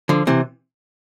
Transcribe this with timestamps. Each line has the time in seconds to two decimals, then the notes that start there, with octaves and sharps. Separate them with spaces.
0.09 D3 F3
0.27 C3 E3